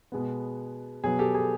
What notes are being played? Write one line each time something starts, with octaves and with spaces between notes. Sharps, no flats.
B2 G#3 B3
B2 F#3 B3 G#4
G4 A4
G#4